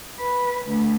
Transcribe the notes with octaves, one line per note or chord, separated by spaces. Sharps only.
B4
D2